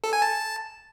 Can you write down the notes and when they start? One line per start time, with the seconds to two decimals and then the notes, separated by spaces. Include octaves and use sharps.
0.04 A4
0.13 G#5
0.22 A5